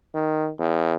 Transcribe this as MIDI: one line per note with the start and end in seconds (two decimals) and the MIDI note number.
0.15 0.50 51
0.59 0.94 40